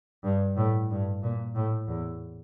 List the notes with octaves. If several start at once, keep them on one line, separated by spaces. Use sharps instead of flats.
G2
A2
G2
A#2
A2
E2